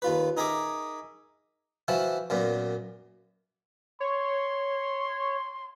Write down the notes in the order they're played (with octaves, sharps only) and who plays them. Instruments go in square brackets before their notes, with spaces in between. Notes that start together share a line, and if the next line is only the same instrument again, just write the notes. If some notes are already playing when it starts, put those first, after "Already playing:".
[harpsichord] D#2 F4 B4
D#4 G#4 A#4 E5 G#5 D6
E3 F3 E4 F#4
F#2 A#2 B3
[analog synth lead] C#5 [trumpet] C6